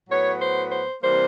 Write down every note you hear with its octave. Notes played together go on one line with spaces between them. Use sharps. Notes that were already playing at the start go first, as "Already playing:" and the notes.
A2 F#3 B3 C#5
C5
C5
C3 E3 G3 A#3 C5